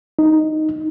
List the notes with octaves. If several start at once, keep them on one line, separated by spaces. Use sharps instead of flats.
D#4